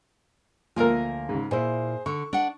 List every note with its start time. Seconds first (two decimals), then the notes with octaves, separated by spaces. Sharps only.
0.76 D2 F3 A#3 A#4 G#5
1.29 G#2 C#3
1.51 A#2 E4 G#4 C5
2.06 D3 C#6
2.33 D4 F#5